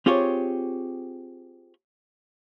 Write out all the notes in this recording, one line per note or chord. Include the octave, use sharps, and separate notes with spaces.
C4 F4 G4 G#4 C#5